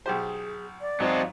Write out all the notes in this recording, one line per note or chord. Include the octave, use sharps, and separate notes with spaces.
B1 G4 G#4 C5
D5
G#2 F#3 C4 F4 D#5 A5